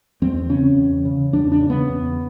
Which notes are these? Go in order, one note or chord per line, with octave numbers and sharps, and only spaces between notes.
E2 C4
C#3 C#4
E2
C#3
E2 D4
D4
C#3
B3
E2